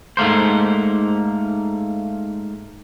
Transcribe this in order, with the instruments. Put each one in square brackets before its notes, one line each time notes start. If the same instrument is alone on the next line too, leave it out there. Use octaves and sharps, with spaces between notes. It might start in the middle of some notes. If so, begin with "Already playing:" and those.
[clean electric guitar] G#2 A3 A#3 C5